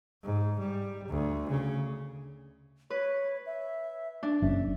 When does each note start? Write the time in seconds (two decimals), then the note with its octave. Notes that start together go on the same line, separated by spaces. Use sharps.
0.23 G#2
0.59 G3
1.09 D2
1.50 C#3
2.90 B4 C#5
3.46 E5
4.23 D4
4.42 F#1 C#4 E5